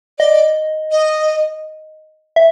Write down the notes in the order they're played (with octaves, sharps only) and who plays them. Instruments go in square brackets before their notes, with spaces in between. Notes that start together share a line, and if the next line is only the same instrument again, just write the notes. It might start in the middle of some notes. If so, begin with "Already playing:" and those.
[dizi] D5 [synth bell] D#5
[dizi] D#5
[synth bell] E5